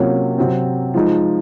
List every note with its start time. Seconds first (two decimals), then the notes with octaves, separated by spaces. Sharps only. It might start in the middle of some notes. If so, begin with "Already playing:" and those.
Already playing: C3 F#3 A#3 C#4 F4
0.38 C3 F#3 C4
0.94 F3 G#3 D#4